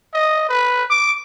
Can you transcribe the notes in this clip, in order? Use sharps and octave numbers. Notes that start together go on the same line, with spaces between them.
D#5
B4
D6